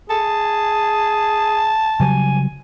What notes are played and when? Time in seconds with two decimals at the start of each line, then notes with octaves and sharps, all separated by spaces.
0.10 G#4 A5
2.00 C#3 F#3 G3 G#5